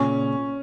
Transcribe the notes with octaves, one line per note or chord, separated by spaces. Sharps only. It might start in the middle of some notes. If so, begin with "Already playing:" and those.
Already playing: A#2 C#3 C#4